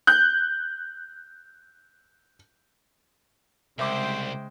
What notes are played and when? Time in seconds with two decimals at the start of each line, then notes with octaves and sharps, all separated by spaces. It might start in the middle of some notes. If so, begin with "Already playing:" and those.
0.07 F#6 G6
3.79 C2 C#3 G#3 C5 E5 G5 D6